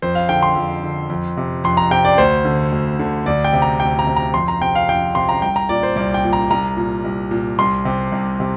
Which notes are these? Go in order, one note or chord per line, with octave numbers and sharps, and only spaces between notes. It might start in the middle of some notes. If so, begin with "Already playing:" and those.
F2 C5
F5
D3 G5
C6
F2
D3
F2
C3
F2 C6
A#5
C3 G5
D5
D2 C5
D3
D2
D3
D2 D5
G5
C3
A#5
D2 G5
A#5
C3
A#5
F2 C6
A#5
C3 G5
F5
F2 G5
C3 C6
A#5
C2 G5
A#5
A#2 D5
C5
C2 D5
G5
A#2
A#5
C2 A#5
A#2
C2
A#2
C2 C6
C3
C2
C3